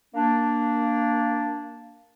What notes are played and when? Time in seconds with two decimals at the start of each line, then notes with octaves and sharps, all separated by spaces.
0.15 A#3 D4